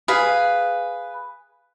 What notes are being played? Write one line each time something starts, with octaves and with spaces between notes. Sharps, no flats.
G#4 B4 F5